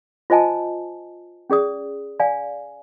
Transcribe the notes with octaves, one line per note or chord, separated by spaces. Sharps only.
F4 C5 D#5 G#5 A5
C#4 G#4 D5 D#6
D5 F5 G#5